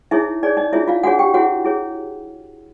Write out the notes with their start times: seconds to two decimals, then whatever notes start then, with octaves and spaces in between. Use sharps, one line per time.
0.11 D#4 E4 G#4 C#5 E5
0.43 D#4 G#4 C#5 D5
0.57 D#4 D#5
0.73 D4 E4 F4 G#4 C#5 E5
0.88 F4 F5
1.03 D4 F4 F#4 G#4 C#5 F#5
1.19 G4 G5
1.34 E4 F#4 G#4 C#5 F#5
1.64 E4 G#4 C#5